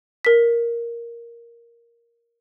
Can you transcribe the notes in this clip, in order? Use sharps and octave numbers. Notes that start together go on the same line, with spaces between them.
A#4 B6